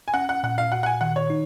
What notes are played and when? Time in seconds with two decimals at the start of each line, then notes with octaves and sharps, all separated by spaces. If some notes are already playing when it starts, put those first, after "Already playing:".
0.08 G#5
0.14 C#4 F#5
0.29 F#5
0.44 A#2 F#5
0.58 F5
0.72 F#4 F#5
0.83 F#5
0.86 G#5
1.01 D#3 F#5
1.16 C#5
1.30 D#4